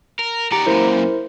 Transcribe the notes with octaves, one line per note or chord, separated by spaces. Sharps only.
A#4
D#3 G4 D5 A#5 C#7
F#2 A#2 E4 A#4 C5